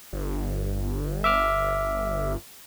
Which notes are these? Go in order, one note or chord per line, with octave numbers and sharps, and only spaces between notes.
G1
E5 D6 F6